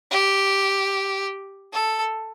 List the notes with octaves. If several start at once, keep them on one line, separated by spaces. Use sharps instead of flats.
G4
A4